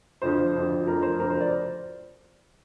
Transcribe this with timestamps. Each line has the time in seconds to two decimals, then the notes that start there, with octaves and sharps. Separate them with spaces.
0.22 F2 D3 F3 C5
0.54 F2 D3 F3
0.86 F2 D3 F3 A#4
1.02 C5
1.19 F2 D3 F3 A#4
1.30 C5
1.40 D5